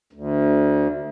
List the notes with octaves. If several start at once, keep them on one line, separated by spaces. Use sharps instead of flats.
D2